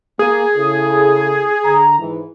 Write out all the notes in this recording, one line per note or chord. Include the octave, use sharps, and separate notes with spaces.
A#3 G#4
C#3 E4 A4
D3 A#5
G#2 E3